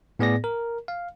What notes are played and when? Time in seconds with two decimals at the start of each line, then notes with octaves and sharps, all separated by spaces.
0.19 A2 B3 G#4 D5 A#6
0.44 A#4
0.88 F5